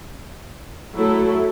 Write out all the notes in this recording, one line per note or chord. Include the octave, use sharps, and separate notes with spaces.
F#3 A3 E4 A4